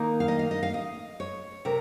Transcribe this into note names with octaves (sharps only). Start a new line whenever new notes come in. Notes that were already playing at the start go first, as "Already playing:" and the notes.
Already playing: D#3 A#3 D#4
F5
D#5
F5
D#5
F5
D#5
C#5
C3 A#4